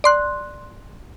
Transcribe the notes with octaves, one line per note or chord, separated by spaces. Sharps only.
D5 C6 F#6